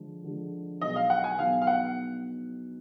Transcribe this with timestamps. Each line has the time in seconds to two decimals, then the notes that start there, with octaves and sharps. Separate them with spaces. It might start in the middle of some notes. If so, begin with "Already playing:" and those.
Already playing: D3 F3 G#3
0.24 D3 F3 G#3
0.81 B2 F#3 B3 D#4 G#4 D#5
0.96 F5
1.10 F#5
1.24 G#5
1.39 B2 F#3 B3 D#4 G#4 F5
1.62 F5
1.67 F#5